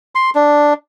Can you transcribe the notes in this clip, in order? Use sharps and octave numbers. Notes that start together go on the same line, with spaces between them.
C6
D4